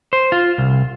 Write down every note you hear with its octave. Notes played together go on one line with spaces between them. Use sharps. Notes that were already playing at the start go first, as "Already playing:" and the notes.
C5
F4
C2